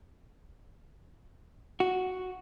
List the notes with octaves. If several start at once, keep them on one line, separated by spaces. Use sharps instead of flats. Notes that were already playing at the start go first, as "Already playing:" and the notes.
F#4